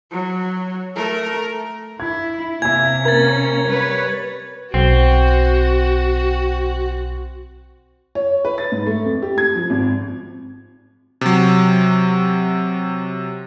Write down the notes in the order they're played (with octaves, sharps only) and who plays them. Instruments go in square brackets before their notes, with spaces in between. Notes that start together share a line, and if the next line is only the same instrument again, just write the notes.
[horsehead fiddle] F#3
A3 A#4
[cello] E4 [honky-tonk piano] G#6
[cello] C3 [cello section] A#3 [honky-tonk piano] E5 G#5 [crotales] G#6
[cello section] A#3 C#4 [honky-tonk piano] A#4 [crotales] G#6 A6
[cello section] G3 B4 C#5
[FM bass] B1 [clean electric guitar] C4 [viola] F#4
[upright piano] C#5
B4
A6
G#2
A3
F2
G4
G#6
F3
G#1
[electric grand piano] C3 F#3